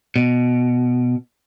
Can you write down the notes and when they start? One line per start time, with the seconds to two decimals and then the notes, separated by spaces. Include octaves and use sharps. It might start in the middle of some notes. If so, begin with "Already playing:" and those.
0.16 B2